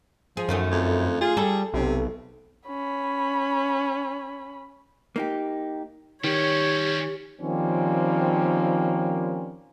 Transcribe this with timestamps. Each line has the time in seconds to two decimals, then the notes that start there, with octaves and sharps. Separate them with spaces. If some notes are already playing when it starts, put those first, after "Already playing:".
0.37 F3 G#4
0.49 F#2 D#3 A3 C#4
0.71 F2
1.21 F4 G#4
1.37 G3 A4
1.74 B1 C3
2.68 C#4 B5
5.16 A#3 D#4 G4
6.24 D#3 G3 C#4 G4 C#5
7.40 D#3 F3 G3 A#3 C4 C#4